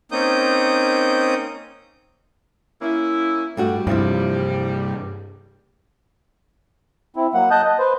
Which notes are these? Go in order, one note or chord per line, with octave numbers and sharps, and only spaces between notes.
A#3 C4 C#4 D#4 D#6 G6
A#3 C#4 E4
G2 G3 A3 F#4
G2 C3 F3 E4 F4
C4 E4
F#3 A#3 F#5
D#5 A5 D#6 F#6 G6
D#5
B4 C5